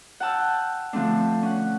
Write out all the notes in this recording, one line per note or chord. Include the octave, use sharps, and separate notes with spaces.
F#5 G5 A5 E6 F6
D3 F3 A3 C4 D4
C#4 F#5